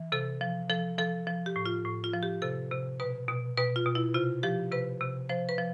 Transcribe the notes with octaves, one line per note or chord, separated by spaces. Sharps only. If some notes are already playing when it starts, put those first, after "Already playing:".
Already playing: E3
C3 A4
F3
F3 A4
F3 A4
F3
G4
A2
F4
A2
F4
F3
G4
C3 A4
C3
B2 B4
B2
B2 B4
F4
B2
E4
C3 F4
F3 G4
C3 B4
C3
F3 C5
B4
F3